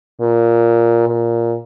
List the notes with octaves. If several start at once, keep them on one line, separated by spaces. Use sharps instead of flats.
A#2
A#2